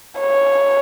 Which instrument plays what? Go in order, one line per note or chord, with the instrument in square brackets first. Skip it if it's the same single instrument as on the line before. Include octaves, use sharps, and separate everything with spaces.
[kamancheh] C#5